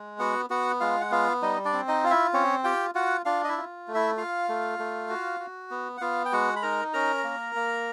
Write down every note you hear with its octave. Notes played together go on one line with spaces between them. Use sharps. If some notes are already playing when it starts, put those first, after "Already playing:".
Already playing: G#3
B3 F#4 F#5
B3 F#4 F#5
G#3 F4 F5
F#5
B3 F4 F5
G3 D#4 D#5
D4 D5
C4
D#4 D#5
F4 F5
E4 E5
C4 C#4 C#5
F4 G4 G5
F4 F#4 F#5
D4 F4 F5
D#5
E4 E5
F4
A3
E4 E5
F4 F5
A3
A3
F#4
F#4
B3
F#5
B3 F4 F5
G5
G#3 F#4 F#5
B5
D#4 A#4 A#5
C#4 A#4 A#5
A#3
A#3